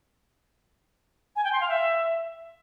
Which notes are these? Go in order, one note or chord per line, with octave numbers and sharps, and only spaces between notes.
G#5
G5
C6
F5
E5